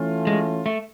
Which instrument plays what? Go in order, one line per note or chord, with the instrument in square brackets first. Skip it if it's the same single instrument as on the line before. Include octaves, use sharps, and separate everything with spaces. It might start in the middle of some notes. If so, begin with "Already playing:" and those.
Already playing: [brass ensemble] E3 A3 C#4 F4
[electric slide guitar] G#3
A3